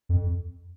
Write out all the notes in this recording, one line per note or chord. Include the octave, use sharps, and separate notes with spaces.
F2